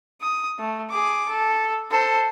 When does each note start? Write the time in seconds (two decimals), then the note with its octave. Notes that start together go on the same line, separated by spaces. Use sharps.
0.21 D#6
0.59 A3
0.90 G#4 D6
1.29 A4
1.91 A4 C5